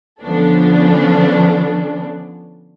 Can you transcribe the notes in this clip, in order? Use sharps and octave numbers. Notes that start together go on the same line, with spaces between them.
D3 F3 B3 C#4 D4 A4